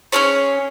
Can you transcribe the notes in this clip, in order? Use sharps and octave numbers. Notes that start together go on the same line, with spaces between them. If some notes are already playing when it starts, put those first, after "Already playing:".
C#4 F4 G#4 C#5